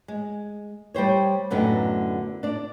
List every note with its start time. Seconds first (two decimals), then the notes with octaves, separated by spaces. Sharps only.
0.08 G#3
0.95 G3 G4 C5 C#5
1.50 F#2 A2 D3 B3 D#4
2.43 D4 D5